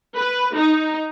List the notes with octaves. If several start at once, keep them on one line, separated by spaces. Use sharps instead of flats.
B4
D#4